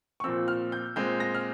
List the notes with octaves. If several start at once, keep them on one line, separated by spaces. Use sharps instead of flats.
C#6
A#2 F3 C4 E6
F6
G6
A#2 G#3 C4 G6
A#6
F6